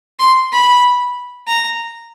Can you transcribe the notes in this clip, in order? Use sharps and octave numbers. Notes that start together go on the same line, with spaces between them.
C6
B5
A#5